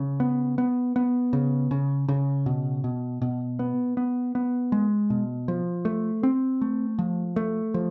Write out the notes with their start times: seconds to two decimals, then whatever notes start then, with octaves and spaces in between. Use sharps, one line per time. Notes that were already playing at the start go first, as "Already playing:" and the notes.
Already playing: C#3
0.20 B3
0.58 B3
0.96 B3
1.33 C#3
1.71 C#3
2.08 C#3
2.46 B2
2.84 B2
3.22 B2
3.59 B3
3.97 B3
4.35 B3
4.72 G#3
5.10 B2
5.48 F3
5.85 A3
6.23 C4
6.61 A3
6.99 F3
7.36 A3
7.74 F3